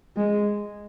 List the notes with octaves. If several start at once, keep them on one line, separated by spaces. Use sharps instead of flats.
G#3